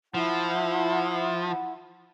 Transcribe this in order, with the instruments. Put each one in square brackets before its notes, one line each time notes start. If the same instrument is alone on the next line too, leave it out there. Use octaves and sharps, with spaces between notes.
[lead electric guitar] F3 [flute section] E4 F#5